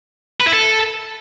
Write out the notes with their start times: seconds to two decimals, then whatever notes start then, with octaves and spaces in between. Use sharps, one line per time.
0.41 B4
0.47 E4
0.54 A4